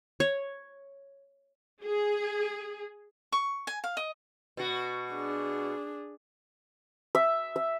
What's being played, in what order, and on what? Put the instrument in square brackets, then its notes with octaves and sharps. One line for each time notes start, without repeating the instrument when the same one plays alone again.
[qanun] C#5
[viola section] G#4
[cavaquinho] C#6
G#5
F5
D#5
[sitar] B2 F#4
[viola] D4 G#4
[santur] E5
E5